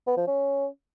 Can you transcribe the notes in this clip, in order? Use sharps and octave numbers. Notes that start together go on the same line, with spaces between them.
B3
F3
C#4